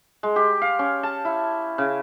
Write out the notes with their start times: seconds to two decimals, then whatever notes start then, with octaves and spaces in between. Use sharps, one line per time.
0.23 G#3
0.36 G4
0.62 F5
0.79 C#4
1.03 A5
1.25 E4
1.78 C#3